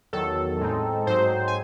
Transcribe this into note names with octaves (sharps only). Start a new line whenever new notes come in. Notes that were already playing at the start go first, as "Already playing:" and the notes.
E2 D#3 F#3 A4
A2 G#3 C4 D#4
G#2 F#3 C4 D#4 C5
G#5